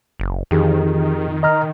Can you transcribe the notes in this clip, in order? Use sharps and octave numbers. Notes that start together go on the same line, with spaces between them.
F#1
F2 D#3 E3 G4 G#4
D#5 A#5 F6